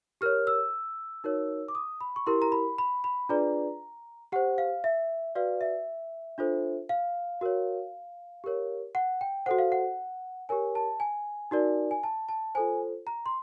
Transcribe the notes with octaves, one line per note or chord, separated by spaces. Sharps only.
G4 A#4 C#5 F6
E6
D#4 F#4 A#4 C#5
D6
D#6
B5
C#6
E4 G4 A#4 C6
A#5
B5
B5
B5
D4 F4 G#4 B4 D5 A#5
G4 C5 F#5
F5
E5
F#4 B4 D5 F5
E5
D4 F4 A4 C5
F5
F#4 A#4 C#5
G4 A#4 C#5
F#5
G5
F#4 A4 C5 F#5
F5
F#5
G4 A#4 C#5 G#5
A5
G#5
D#4 F#4 A#4 D5
G#5
A5
A5
F4 A4 C5 G#5
A#5
C6